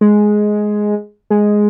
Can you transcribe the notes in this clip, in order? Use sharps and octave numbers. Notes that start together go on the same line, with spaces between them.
G#3
G#3